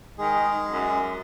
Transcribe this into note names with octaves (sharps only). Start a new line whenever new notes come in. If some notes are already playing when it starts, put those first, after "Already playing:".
D#3 G#3 G#4
F#2